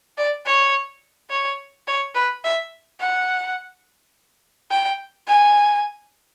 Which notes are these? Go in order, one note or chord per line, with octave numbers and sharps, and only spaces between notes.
D5
C#5
C#5
C#5
B4
E5
F#5
G5
G#5